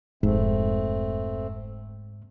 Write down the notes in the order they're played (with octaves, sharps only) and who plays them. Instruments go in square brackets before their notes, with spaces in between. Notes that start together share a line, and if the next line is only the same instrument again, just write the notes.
[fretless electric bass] F1 [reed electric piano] G#2 [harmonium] A3 C4